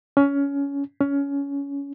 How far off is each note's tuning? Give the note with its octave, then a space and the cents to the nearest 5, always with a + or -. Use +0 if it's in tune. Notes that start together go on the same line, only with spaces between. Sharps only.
C#4 +20
C#4 +20